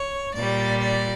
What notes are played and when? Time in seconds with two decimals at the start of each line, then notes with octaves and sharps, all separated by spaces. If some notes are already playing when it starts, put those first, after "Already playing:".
Already playing: C#5
0.34 A#2 G3 D5
0.81 D5